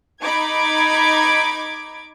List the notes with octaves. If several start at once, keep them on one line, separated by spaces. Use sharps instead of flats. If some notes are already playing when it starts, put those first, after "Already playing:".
D#4 B5 D6 G#6 D7